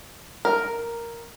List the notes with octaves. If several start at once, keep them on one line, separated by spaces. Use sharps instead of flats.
A#4